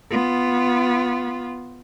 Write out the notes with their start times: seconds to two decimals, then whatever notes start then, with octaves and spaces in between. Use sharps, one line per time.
0.11 B3 F4